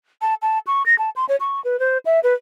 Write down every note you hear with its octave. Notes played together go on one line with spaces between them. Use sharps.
A5
A5
C#6
A#6
A5
C6
C#5
C#6
B4
C5
E5
B4